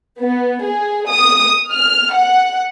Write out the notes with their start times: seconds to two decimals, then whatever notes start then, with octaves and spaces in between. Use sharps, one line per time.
0.20 B3
0.63 G#4
1.10 D#6
1.71 F6
2.14 F#5